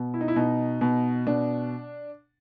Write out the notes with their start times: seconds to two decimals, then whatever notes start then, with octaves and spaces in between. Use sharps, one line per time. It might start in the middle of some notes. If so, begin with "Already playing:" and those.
Already playing: B2
0.14 E4
0.21 D#4
0.28 E4
0.36 B2 D#4
0.81 B2
1.27 B2 D4